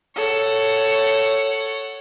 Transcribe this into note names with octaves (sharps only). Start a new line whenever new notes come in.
A4 C#5 F#5